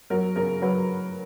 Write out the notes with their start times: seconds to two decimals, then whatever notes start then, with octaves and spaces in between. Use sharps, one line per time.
0.10 F#3 A#4
0.36 C#3 A#4
0.62 F#3 B4